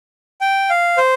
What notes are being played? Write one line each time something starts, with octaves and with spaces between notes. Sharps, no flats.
G5
F5
C5